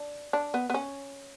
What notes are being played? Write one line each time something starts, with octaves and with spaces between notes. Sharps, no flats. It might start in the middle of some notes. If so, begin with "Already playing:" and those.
Already playing: D4
D4
B3
B3
C#4